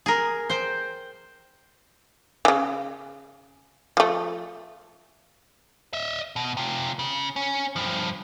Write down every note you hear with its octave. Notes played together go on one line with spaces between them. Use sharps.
G#4 A#4
C5 G5
C#3 E3
F3 A3
D#5 E5
B2
C3 F4
C#3
C#4
G2 F3